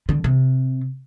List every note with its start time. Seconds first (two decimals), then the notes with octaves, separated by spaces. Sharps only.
0.09 D3
0.24 C3